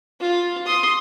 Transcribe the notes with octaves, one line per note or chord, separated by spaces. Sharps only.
F4
C6 D#6